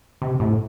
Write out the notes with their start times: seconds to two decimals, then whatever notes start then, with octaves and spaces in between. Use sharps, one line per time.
0.22 C3
0.40 A2